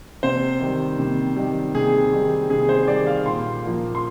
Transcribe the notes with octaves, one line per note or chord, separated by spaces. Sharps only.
C3 C5
D#3 G3
C3
D#3 G3
C3 G#4
D#3 G3
C3 G#4
C5
D#3 G3 D5
F5
A#2 C6
F3 A#3
C6